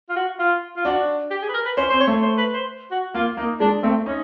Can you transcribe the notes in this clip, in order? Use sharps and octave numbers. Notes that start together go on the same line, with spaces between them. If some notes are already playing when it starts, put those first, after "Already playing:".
F4
F#4
F4
F4
D4 F#4
G4
G#4
B4
A#4
B4
C#4 C5
C4 C5
C#5
A3
C5
B4
C5
F#4
A#3 F4
A#3 D#4
G#3 D4
A3 C4
C#4 D#4